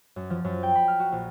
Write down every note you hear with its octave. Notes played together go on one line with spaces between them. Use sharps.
F#2
F3
F#2
G5
B5
F6
F#4
A#1